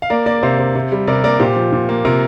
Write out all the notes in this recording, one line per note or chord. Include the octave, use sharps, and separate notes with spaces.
F5
A#3 A#4 D5
A#3 A#4 D5
C3 C5 F5
C3
C3
G3
C3 A#4 D5
A#3 A#4 D5
A#2 G4 C5
F3
A#2
A#3
C3 F4 A#4